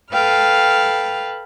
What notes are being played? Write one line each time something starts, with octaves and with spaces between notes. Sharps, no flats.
A4 B4 F5 G5 F6